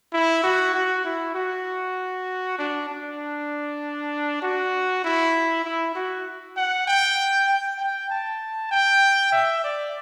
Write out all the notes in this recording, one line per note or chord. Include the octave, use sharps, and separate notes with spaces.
E4
F#4
F#4
E4
F#4
D4
D4
F#4
E4
E4
F#4
F#5
G5
G5
G5
A5
G5
E5
D5